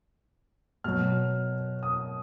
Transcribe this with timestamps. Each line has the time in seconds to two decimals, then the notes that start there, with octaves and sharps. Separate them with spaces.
0.84 B2 F#3 F6
1.83 D#6